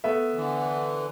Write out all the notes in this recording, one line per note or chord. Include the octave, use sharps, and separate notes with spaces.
A3 B3 E5
D3 E3